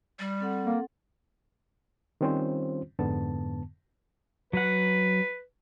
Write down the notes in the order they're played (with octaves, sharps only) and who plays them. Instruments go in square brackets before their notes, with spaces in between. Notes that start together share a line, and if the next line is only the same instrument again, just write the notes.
[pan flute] G3
[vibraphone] C4 A4 F#5
[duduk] A#3
[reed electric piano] D#3 G3 C4 C#4 F4 C5
F2 G#2 D3 B3 A5
[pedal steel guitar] F#3 F#5 [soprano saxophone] B4